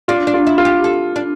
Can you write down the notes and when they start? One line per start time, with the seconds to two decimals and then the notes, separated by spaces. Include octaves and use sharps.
0.08 D4 F4
0.27 D4
0.34 F4
0.47 E4
0.58 F4
0.65 G4
0.84 A4
1.16 D4